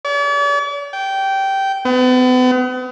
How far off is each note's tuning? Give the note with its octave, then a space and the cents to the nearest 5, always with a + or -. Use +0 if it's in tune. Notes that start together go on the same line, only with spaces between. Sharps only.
D5 -45
G5 -15
B3 +40